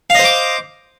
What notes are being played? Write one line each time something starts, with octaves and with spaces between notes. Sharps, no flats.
C5 D#5 F5 D6